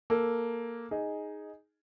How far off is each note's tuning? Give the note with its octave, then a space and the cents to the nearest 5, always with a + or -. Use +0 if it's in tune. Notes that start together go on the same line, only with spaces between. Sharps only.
A#3 +0 A4 +0
D#4 +0 G#4 +0